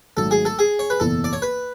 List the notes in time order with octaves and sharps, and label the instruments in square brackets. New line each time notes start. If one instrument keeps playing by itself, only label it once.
[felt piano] G#1 G#2 F#3 A3 [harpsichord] A4
[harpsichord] G#4
A4
G#4
C#5
B4
[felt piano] F#1 E2 B2 [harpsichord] A4
[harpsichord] D5
C#5
B4